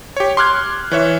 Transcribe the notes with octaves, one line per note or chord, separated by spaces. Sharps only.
G4 C#5
C6 D6 F6 F#6 G#6
E3 C#5 E5